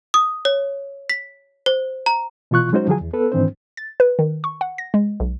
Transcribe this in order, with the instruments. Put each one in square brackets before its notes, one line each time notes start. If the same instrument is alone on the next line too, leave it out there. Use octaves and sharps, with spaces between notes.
[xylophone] D#6
C#5
B6
C5
A#5
[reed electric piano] B2 E3 F4 C#6 F#6
F#3 G#3 C#4 D#4 F#4 C5
D3 F3 F#3 G#4 G#5
E2
B3 A4 B4
G#2 D#3 E3 C4 D4 C5
[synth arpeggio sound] A6
B4
D#3
C#6
F#5
A#6
G#3
B1